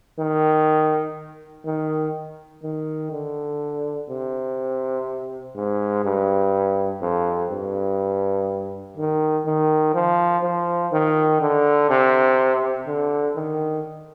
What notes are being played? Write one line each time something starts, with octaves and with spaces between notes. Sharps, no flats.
D#3
D#3
D#3
D3
C3
G#2
G2
F2
G2
D#3
D#3
F3
F3
D#3
D3
C3
D3
D#3